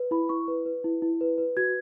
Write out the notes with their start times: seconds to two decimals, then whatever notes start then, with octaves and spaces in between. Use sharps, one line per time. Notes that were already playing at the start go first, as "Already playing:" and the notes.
Already playing: B4
0.11 E4 B5
0.29 E4 C#6
0.48 B4
0.66 B4
0.84 E4
1.02 E4
1.21 B4
1.38 B4
1.57 F#4 G#6